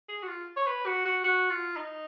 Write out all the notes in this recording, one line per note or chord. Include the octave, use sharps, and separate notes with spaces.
G#4
F#4
F4
C#5
B4
F#4
F#4
F#4
F4
D#4